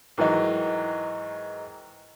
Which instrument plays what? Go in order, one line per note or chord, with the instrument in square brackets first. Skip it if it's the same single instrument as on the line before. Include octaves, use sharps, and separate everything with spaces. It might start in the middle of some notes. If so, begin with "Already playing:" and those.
[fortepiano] G#2 D#3 E3 F#3 D#4